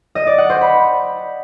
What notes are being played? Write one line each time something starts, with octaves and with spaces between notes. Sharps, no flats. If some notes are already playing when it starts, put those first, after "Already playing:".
D#5
D5
F#5
C5
B5